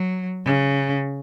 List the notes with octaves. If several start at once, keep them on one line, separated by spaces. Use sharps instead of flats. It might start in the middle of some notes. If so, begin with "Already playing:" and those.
Already playing: F#3
C#3